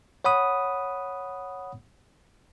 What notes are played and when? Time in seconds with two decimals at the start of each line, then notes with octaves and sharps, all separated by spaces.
0.25 C#5 F#5 B5 D#6